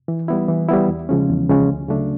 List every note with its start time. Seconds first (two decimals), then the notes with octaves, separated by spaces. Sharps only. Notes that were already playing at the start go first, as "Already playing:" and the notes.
0.08 E3
0.28 G3 B3 E4
0.49 E3
0.69 G3 B3 E4
0.88 E2
1.09 C#3 F3 G#3 C#4
1.29 E2
1.49 C#3 F3 G#3 C#4
1.69 D2
1.89 C#3 F#3 A3 D4